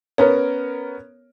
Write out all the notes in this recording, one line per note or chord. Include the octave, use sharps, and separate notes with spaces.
B3 C#4 A#4 C#5